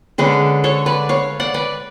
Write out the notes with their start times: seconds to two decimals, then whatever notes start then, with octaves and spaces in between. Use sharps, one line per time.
0.18 D3 G#3 C#4 G#4 B4
0.64 A4 C#5
0.86 B4 D5
1.09 C#5 F5
1.40 D5 F#5
1.54 B4 D5